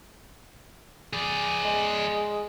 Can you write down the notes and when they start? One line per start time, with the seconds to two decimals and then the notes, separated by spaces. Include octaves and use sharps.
1.13 G#4 D5
1.65 G#3